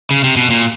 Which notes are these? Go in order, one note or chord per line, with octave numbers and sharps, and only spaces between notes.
C#3
C3
B2
A#2